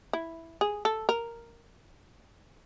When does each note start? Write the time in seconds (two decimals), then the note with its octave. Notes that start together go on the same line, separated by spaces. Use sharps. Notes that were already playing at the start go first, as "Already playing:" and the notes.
0.13 E4
0.61 G#4
0.85 A4
1.09 A#4